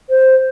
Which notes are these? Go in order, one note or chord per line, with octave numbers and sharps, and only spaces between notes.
C5